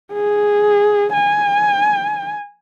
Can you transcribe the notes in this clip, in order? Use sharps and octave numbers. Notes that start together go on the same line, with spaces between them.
G#4
G#5